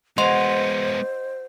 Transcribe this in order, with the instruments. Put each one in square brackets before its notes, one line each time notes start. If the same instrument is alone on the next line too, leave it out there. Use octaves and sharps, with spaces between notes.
[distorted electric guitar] G#3 B3 [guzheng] F#4 [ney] C5 [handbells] D#5 C6